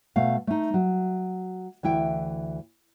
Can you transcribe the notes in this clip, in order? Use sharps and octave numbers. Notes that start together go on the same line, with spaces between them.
B2 A3 F5
A3 D#4
F#3
D2 E3 E4 G5